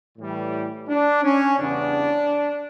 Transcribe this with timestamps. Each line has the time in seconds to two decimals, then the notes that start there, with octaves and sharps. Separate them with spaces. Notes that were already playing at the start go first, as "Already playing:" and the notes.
0.18 A2 E3 G3
0.89 D4
1.23 C#4
1.58 E2 C#3 E3 G3 B3 D4